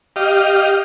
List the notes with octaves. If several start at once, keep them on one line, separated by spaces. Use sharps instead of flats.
G4 D#5 F5